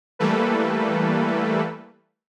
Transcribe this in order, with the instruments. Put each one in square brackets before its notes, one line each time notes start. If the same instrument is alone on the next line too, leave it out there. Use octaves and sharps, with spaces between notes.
[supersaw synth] E3 G3 A3 A#3 A4 B4